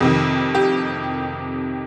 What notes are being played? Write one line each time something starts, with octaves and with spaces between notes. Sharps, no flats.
F2 C3 D#3
G4